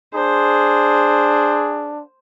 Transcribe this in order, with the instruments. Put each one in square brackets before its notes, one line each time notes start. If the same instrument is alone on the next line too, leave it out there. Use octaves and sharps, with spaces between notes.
[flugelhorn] D4 [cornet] G#4 [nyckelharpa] C5